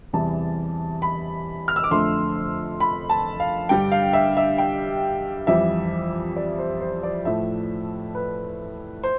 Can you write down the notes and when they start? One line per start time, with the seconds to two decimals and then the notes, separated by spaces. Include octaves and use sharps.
0.13 E2 C3 E3 G3 A5
1.02 B5
1.68 F6
1.76 E6
1.84 D6
1.91 F2 D3 A3 C6
2.80 B5
3.10 A5
3.40 F5
3.69 G2 D3 G3 G5
3.92 F5
4.13 E5
4.37 E5
4.58 G5
5.47 F2 E3 G3 E5
6.36 D5
6.59 C5
6.81 C5
7.03 D5
7.25 A2 F3 A3 E5
8.15 B4
9.03 C5